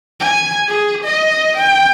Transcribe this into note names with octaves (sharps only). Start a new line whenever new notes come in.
G#5
G#4
D#5
G5